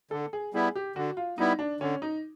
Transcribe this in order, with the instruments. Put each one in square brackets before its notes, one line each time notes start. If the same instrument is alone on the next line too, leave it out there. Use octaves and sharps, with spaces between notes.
[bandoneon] D3 [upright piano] A4
[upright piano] G#4
[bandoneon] G3 B3 E4 [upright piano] G#4
[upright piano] G4
[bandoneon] D3 [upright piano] F#4
[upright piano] F4
[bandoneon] G3 B3 E4 [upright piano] D#4
[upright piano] D4
[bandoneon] D3 [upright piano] C#4
[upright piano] D#4